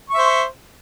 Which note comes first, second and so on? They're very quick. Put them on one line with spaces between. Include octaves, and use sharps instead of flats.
C#6 E5 C5